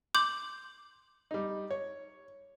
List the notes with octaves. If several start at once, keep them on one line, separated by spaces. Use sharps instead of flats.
C6 D6 G6 F#7
G3 D#4
C#5